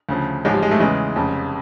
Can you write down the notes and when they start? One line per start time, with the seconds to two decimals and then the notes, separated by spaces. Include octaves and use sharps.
0.09 D2 C#3 F3
0.45 A1 G#2 F3 G#3
0.53 G3
0.62 G#3
0.71 A3
0.80 E2 C#3 E3 G#3
1.16 F1 F2 C#3